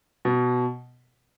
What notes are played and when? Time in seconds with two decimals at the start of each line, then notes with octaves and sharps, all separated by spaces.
0.25 B2